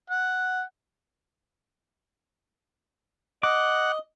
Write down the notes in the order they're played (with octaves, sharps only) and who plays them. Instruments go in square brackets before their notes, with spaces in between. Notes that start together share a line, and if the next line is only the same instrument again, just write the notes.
[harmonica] F#5
[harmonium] D#5 [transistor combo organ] F#5 [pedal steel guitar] D6